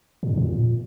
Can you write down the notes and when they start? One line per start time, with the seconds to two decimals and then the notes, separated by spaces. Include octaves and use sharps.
0.23 A2
0.30 F2
0.37 A#2